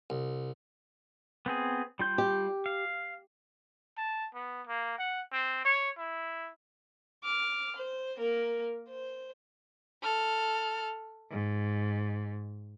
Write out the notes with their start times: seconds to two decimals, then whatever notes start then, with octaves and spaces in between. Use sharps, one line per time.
0.10 C2
1.46 B3 C4 G#4
1.99 G3 F4 G6
2.18 G4
2.66 F5
3.97 A5
4.34 B3
4.67 A#3
4.98 F#5
5.32 C4
5.65 C#5
5.98 E4
7.24 D6 F6
7.76 C5
8.17 A#3 A#4
8.89 C5
10.02 A4 F6
11.29 G#2